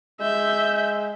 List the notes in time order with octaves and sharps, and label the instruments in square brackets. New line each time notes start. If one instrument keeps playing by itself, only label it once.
[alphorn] G#3 [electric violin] E5 G6